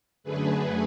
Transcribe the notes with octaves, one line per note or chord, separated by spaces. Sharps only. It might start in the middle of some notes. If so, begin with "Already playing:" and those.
F#2 D3 A3 G#4 B4